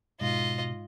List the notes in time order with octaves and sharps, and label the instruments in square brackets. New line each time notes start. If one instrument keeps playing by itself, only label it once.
[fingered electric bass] G#2 [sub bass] B2 [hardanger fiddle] F4 D#5